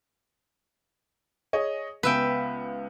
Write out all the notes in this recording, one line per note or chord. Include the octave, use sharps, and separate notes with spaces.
G#4 C#5 D#5
C#2 B3 B4 E5 G5